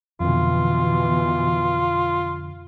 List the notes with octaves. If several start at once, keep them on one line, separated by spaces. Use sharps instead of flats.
F2 B2 D3 E3 F4